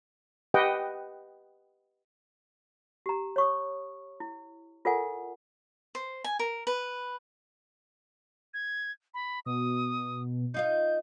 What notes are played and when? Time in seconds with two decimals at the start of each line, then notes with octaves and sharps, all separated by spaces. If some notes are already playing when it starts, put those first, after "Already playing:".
0.54 G4 B4 D#5 F#5 G5
3.06 G4 A#5
3.36 C#5 C#6 D#6
4.20 E4
4.85 F4 A4 A#4 D5 F#5 G#5
5.95 C5
6.24 G#5
6.39 A#4
6.67 B4
8.54 G#6
9.14 B5
9.46 B2 D#6
10.54 D#4 F4 D#5 G6